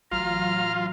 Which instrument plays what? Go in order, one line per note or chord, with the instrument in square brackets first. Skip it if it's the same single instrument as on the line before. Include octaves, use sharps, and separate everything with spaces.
[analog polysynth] A1 F#3 [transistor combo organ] F4 [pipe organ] A#5 F6